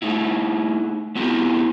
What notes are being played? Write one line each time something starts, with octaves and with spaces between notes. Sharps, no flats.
A3 D#4 E4
B3 C4 E4 F4 G4